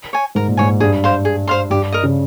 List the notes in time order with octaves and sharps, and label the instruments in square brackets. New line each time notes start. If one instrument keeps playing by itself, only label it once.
[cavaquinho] C#5 G#5
[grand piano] G#2 [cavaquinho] A#4
[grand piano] A#2
[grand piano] G#2 [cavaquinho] C#5 G#5
[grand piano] G2 [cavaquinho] G#4
[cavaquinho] C5 F5 C6
G#4
C5 F5 C6
[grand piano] G2 [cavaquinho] G4
[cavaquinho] A#4 D#5
[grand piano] C#3